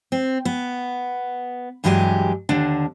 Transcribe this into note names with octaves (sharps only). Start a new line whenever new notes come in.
C4
B3
G2 E3 F#3 G#3 G4 G#5
D#2 D3 D4